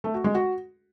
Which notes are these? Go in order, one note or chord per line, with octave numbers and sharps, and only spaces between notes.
A3
F#4
G#3
F#4